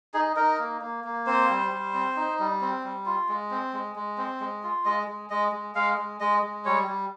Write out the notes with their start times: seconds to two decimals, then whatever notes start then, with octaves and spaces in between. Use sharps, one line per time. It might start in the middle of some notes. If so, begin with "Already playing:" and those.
0.14 D#4 G#4
0.36 D#4 A#4
0.59 A#3
0.81 A#3
1.04 A#3
1.27 C4 C5
1.49 G3
1.72 G3
1.94 C4
2.16 D#4
2.39 G3
2.61 C4
2.84 G3
3.06 F4
3.29 G#3
3.51 C4
3.73 G#3
3.96 G#3
4.18 C4
4.40 G#3
4.64 F4
4.85 G#3 D#5
5.08 G#3
5.30 G#3 D#5
5.52 G#3
5.75 G#3 F5
5.98 G#3
6.20 G#3 D#5
6.43 G#3
6.65 G3 C#5
6.87 G3